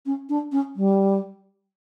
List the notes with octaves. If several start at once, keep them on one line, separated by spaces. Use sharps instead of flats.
C#4
D4
C#4
G3